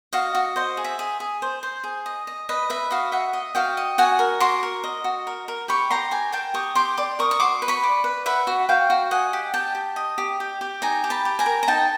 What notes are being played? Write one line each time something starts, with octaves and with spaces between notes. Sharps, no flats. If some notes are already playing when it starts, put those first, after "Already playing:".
F#4 D#5 F5
F#4
C5 D#5
G#4
E5
G#4
G#4
C5
C5
G#4
D#5
D#5
B4 D#5
B4 E5
F#4 D#5 F5
D#5 E5 F#5
D#5
F#4 F5 G5
D#5
F#4 F#5 G#5
A#4
F#4 C6 D6
A#4
D#5
F#4
A#4
A#4
G4 B5 C#6
G4 A#5 C6
G4 G#5 A#5
A#4 G5 A5
G4 C#6 D#6
G4 C6 D6
D5 C6 D6
A#4 C#6 D#6
C#6
F#4 C6 D6
B4
B5 C#6
D5
B4
B4 E5 F#5
F#4
F#4 F5 G5
F#4
D#5 F#5 G#5
G4
G4 G5 A5
G4
D#5
G4
G4
G4
D#4 G#5 A#5
G4
A5 B5
G4
G#5 A#5
A#4
A#5
D#4 G5 A5